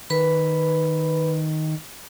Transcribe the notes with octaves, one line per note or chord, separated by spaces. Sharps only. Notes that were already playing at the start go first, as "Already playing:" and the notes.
D#3 B4 B5